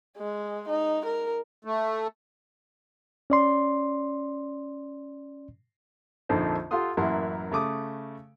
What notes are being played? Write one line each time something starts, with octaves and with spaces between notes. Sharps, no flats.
G#3
D#4
A#4
A3
C#4 D5 C6
A#1 F2 D3 D#4 A4 C5
F4 G4 A4 F#5 C6 D#6
A1 F#2 A#3 E4 F#5 C6
C#3 A3 D6 D#6